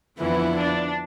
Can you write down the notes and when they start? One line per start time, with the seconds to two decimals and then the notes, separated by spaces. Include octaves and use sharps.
0.18 F2 D3 E3 F3 B3 E4
0.55 D4